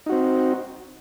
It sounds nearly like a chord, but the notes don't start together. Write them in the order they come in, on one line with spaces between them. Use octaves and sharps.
D#4 F#4 C4